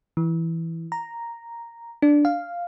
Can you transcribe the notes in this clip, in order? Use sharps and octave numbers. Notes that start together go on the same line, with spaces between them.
E3
A#5
D4
F5